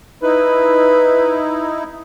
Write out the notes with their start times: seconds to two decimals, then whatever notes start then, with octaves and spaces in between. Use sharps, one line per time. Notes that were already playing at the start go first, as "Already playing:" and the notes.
0.23 D#4 E4 B4